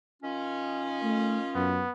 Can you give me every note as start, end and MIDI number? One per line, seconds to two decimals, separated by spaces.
0.23 1.81 51
0.23 1.81 61
0.23 1.84 65
1.03 1.38 57
1.55 1.83 42
1.55 1.92 59